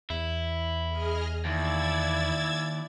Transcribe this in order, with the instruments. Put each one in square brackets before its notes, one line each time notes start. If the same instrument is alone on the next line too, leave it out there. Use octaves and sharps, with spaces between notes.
[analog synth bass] E2 [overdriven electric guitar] E4
[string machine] G#4 D#5 F6
[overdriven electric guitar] D#2 [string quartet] E4 D5 [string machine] E6 G#6 A6